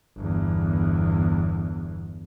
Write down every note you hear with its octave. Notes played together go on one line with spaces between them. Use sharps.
G1 E2